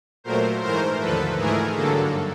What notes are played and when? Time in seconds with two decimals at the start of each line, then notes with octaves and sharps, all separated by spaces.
0.24 A#2 F#3 A3 A#4 C5
0.62 G#2 E3 A3 A#4 C5
1.00 D#2 D3 F3 A4 B4
1.37 G#2 E3 A3 G#4 A#4
1.75 G2 D3 F#3 A#3 A4